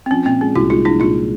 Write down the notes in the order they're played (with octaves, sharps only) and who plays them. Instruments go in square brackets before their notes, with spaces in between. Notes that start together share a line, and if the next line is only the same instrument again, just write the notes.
[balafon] C4
[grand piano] F3 [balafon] C#4
[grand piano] A#2 [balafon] C4
[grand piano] G#3 [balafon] C#4
[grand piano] C2 [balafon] E4 F#4
[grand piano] G#3 [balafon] D#4 F4
[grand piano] F3 [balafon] D4 E4
[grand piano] A#2 [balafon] D#4 F4